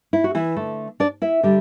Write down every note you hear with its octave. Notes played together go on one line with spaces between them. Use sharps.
E4
F#4
E3 E4
D3 A3
D4 D5
E4 E5
D3 G3